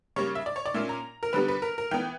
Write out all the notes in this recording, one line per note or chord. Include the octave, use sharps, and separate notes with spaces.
C#3 G3 A#3 C#5
E5
D5
C#5
D5
A#2 A#3 C#4 E5
A#5
A#4
D3 G3 B3 B4
B4
A#4
A#4
E3 B3 G5